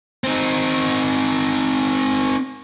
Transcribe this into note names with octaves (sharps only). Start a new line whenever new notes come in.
C4 D#4